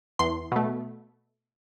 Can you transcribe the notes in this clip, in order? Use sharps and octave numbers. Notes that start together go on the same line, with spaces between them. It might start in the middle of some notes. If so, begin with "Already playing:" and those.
E2 C6
B2 A3